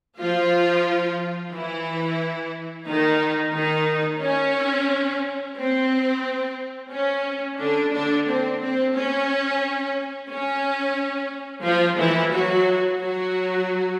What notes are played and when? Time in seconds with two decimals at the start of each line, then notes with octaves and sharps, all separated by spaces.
0.19 F3 F4
1.53 E3 E4
2.88 D#3 D#4
3.56 D#3 D#4
4.23 C#4
5.59 C4
6.93 C#4
7.60 D3 D4
7.94 D3 D4
8.28 C4
8.62 C4
8.95 C#4
10.30 C#4
11.65 F3 F4
11.99 E3 E4
12.32 F#3 F#4
13.00 F#3 F#4